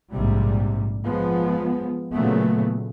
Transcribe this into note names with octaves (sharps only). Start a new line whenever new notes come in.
A#1 G#2 C3 G3
F3 G#3 B3
A#2 C#3 F#3 A3 B3